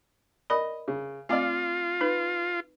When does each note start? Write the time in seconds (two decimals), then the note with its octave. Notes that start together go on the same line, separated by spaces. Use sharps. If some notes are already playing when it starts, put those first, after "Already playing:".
0.50 A#4 D5 D#5 B5
0.88 C#3
1.29 A3 C4 F4 D5 F5 D6
2.01 D#4 B4